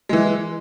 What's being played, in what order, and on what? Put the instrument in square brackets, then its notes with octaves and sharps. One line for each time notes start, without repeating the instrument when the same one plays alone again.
[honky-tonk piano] E3 G#3